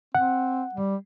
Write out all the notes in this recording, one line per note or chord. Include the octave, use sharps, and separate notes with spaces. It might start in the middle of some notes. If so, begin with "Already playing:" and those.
C4 F#5
G3